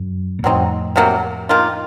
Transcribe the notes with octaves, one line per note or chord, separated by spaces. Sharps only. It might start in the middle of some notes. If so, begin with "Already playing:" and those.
Already playing: F#2
A#2
F2 A2 F#3 C4 D#4
C3 F#3 A#3
D#3 A#3 F4